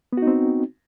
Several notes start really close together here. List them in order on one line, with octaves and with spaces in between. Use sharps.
B3 F#4 D#4 C4